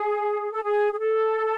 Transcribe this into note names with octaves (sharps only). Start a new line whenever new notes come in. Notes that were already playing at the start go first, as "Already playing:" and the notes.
Already playing: G#4
A4
G#4
G#4
A4